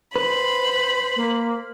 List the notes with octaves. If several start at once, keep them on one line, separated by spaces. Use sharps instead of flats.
B4 C5 B5
A#3